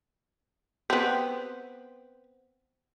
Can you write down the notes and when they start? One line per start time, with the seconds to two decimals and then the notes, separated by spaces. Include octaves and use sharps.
0.90 B3 C4